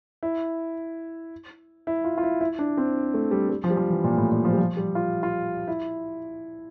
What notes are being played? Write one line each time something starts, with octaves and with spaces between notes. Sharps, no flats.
E4
E4
F4
F4
E4
E4
D4
C4
A3
G3
G3
F3
G3
F3
E3
A#2
A2
A#2
F3
G3
F3
G3
F4
F4
E4